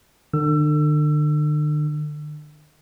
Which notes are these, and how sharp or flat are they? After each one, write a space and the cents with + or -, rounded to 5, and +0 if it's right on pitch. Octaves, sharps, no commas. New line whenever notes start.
D3 +40 E6 +25